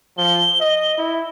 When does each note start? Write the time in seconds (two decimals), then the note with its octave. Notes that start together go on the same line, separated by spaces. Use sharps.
0.18 F3 G7
0.60 D#5
0.98 E4